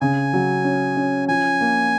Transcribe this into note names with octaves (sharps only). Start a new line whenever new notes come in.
C#3 G#5
F#3
C#4
C#4
F3 G#5
A#3